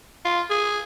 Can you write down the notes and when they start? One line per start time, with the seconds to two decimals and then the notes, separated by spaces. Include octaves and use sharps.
0.25 F4
0.50 G#4